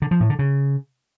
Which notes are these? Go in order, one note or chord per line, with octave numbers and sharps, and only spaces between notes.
D3
F3
A2
D3
C#3